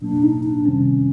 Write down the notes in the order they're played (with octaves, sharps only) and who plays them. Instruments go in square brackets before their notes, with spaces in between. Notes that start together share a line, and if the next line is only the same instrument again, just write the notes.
[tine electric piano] B2 F#3 A#3 [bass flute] D4
[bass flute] D#4
D4
[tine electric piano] C3 D#3 G3 C4 [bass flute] C#4